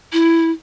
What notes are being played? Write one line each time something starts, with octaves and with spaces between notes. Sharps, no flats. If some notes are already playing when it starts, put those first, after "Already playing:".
E4